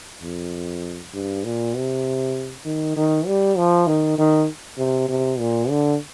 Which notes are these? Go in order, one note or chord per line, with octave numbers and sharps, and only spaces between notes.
F2
G2
A#2
C3
D#3
D#3
G3
F3
D#3
D#3
C3
C3
A#2
D3